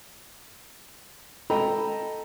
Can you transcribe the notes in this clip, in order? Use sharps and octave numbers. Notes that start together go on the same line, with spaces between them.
A4 D#5 G5 A#5 B5